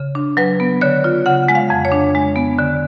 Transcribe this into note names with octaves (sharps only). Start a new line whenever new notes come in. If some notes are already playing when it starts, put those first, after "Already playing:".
Already playing: C#3
D4
F#3 B4
B3
D3 C#5
F4
C#3 F#5
G#3
F5
F2
C#5
D4
G#3
B3
D3